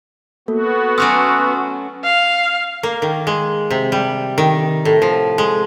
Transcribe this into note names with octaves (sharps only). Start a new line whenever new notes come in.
A#3 B3 F#4 A4
F#3 A3 C#4 C6 D#6 E6
F5
A#3
D#3
G#3
C3
G3
D#3
A2
F3
G#3